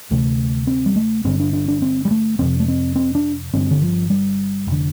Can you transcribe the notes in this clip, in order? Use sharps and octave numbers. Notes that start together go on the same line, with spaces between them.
D2 C3 A3
C4
G3
A3
G1 G2 D3 C4
D4
D4
D4
C4
G3
A3
F1 F2 C3 C4
A3
C4
C4
D4
G1 G2 D3 C4
D3
F3
G3
F1 D3